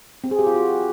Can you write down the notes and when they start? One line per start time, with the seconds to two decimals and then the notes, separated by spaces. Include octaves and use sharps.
0.24 C4
0.31 G#4
0.39 G4
0.47 F4
0.54 F#4